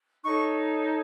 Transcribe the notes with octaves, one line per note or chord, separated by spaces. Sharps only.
D#4 A4 C#5 C#6